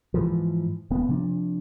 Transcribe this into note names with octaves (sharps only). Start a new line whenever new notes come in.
G#2 E3 F3
D#1 B3
C3 F3 D4